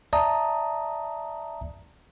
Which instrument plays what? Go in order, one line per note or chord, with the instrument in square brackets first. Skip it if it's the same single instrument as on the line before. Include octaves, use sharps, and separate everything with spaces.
[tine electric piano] D5 E5 A5 A#5 D#6